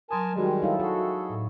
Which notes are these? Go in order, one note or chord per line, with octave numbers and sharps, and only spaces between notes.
F#3 A#4 G#5 A5 C6 D#6
D#3 G3 G#3 F#4 A#4 C6
D#4 E4 A4 C#5 F5
F#4 G#4 A4
A2